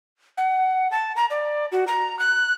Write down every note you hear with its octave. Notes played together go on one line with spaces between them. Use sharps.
F#5
A5
A#5
D5
F#4
A#5
F#6